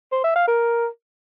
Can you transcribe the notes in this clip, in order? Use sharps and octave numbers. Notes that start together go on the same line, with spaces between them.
C5
E5
F5
A#4